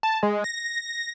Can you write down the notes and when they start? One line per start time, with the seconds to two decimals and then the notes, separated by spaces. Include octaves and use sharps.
0.03 A5
0.23 G#3
0.44 A#6